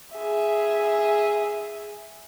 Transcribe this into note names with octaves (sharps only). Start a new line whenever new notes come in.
G#4 E5